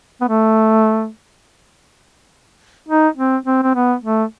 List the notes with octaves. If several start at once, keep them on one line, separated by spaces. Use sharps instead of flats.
B3
A3
D#4
C4
C4
C4
B3
A3